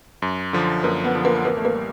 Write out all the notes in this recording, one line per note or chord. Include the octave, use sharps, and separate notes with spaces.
F#2
D3 F3
F#2 A#3
B3
D3 F3
A#3
A1 A#3
A3
A#3
G3